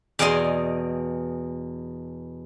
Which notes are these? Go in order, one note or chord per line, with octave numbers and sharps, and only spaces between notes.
E2 B2 D5 D#5 G#5 C6